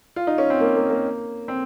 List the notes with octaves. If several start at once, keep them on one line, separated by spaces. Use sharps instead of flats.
F4
D#4
C#4
C4
A#3
A#3
A#3
C4